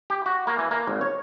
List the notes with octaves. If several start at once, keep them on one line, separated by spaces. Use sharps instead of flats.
G4
F#4
A#3
E3
A#3
G#1
C#5